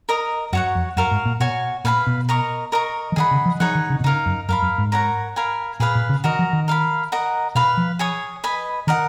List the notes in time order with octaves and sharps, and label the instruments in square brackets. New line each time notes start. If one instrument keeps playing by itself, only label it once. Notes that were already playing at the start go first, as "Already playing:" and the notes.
[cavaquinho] A#4 D#5 A#5 D#6
[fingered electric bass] F#2 [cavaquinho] F#4 C#5 F#5
[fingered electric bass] F2
[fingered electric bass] F#2 [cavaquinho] F#4 A#4 F5
[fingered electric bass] G#2
A#2
[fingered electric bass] B2 [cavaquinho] F#4 C#5 G#5
[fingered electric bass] A#2 [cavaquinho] B4 F5 G#5 B5
[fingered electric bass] B2
[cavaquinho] A#4 D#5 A#5 C#6
A#4 D#5 A#5 C#6
[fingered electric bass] F3
[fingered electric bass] D#3 [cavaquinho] G#4 D#5 F#5 B5
[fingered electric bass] C#3
F3
[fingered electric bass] F3 [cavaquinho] D#4 G#4 C#5 F#5
[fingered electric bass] D#3
C#3
B2
[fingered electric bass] C#3 [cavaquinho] D#4 A#4 F5
[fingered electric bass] F#2
[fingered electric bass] F#2 [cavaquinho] A#4 F5 B5
[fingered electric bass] F#2
G#2
[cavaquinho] A#4 C#5 F#5 A#5
A#4 F5 G#5 B5
[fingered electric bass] A#2 [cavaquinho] G#4 B4 F5 B5
[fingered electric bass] A#2
C#3
[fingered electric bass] D#3 [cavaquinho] F#4 A#4 D#5
[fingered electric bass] F3
D#3
[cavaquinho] A#4 F5 B5
A#4 D#5 F#5 A#5
[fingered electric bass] B2 [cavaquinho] B4 F5 B5
[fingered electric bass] F3
[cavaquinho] G#4 C#5 G#5 D#6
B4 D#5 G#5 B5
[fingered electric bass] D#3 [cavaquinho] A#4 D#5 F#5